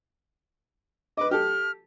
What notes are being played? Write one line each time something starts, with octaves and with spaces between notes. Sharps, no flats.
B4 D#5 D6
G4 A4 F6